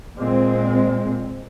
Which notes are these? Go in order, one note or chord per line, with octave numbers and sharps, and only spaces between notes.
A#2 G#3 C4